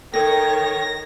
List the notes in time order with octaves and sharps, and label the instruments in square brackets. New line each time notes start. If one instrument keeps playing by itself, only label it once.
[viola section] D#3 C#5 [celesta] A4 A#4 [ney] G5 [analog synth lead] A#6